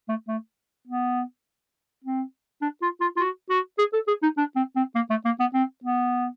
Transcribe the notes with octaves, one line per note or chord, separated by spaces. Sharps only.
A3
A3
B3
C4
D4
F4
F4
F4
F#4
F#4
G#4
A4
G#4
D#4
D4
C4
C4
A#3
A3
A#3
B3
C4
B3